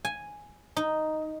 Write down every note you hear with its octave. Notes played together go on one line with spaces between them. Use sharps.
G#5
D#4